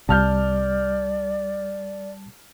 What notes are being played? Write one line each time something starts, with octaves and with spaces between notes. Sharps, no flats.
C2 C3 G3 D5 A5 F6 G6